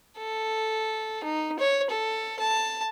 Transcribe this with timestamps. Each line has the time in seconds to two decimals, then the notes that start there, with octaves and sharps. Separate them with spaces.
0.18 A4
1.24 D#4
1.59 C#5
1.90 A4
2.40 A5